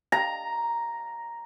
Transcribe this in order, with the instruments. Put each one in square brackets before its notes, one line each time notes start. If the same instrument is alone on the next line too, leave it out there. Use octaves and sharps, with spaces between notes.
[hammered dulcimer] A#5